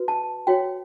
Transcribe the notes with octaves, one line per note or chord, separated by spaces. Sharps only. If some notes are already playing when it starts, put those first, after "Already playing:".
Already playing: F#4 B4
A5
F#4 C#5 G5